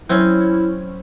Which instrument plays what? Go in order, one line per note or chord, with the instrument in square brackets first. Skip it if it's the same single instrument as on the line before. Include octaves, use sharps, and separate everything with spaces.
[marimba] F#3 [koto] C4 C#4 [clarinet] E4